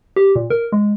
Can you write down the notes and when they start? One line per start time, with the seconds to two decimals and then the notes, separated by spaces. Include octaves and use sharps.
0.16 G4
0.36 A#2
0.50 A#4
0.72 G#3